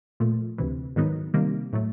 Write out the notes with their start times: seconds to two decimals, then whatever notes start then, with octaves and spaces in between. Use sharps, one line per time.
0.20 A#2 F3 A3
0.58 D2 C3 E3
0.96 G#2 D#3 F#3 B3 D#4
1.34 C3 D#3 G3 A#3
1.73 A2 F#3 A3